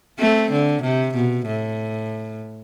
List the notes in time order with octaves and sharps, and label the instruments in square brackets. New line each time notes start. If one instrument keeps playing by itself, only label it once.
[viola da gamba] A3 C4
D3
C3
B2
A2